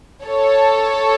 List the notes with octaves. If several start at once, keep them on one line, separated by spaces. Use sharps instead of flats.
A4 C#5